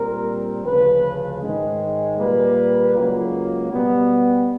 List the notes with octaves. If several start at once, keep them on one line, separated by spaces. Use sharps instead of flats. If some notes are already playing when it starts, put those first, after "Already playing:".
Already playing: A#2 G3 C4 A#4
D2 C#3 F3 B4
G#2 D#3 G#3
A#2 G3 A#3 B4
C#2 C#3 F#3 A#3
B2 G3 B3